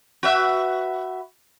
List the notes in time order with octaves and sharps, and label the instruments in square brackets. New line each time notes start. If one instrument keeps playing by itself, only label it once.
[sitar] F#4 B4 E5